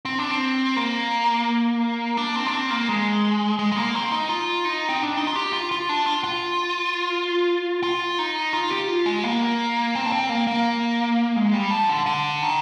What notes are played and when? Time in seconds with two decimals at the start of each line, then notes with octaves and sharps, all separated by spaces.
0.05 C4
0.19 D4
0.31 C4
0.76 A#3
2.17 D4
2.36 C4
2.47 D4
2.53 C4
2.71 A#3
2.89 G#3
3.59 G#3
3.72 G#3
3.76 A#3
3.95 C4
4.11 D#4
4.29 F4
4.65 D#4
4.89 C4
5.00 D4
5.17 D#4
5.27 F4
5.36 G4
5.53 F4
5.71 F4
5.89 D4
6.06 F4
6.24 F4
7.83 F4
8.19 D#4
8.53 F4
8.70 G4
8.88 F4
9.06 G#3
9.24 A#3
9.95 C4
10.06 D4
10.12 C4
10.29 A#3
10.47 A#3
11.36 G#3
11.53 G3
11.71 F3
11.89 D3
12.06 D3
12.42 D#3